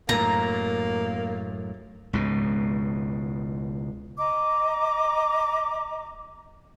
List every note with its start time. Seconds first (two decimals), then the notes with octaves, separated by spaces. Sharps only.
0.09 F#2 A2 A#3 A#5
2.13 C#2 G#2 B2
4.18 D#5 A#5 D6